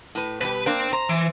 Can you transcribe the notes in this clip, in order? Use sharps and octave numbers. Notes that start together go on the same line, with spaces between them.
A2 B4
B2 G3 G4 B4
A#3 D4 G5 C6
C5 A#5
E3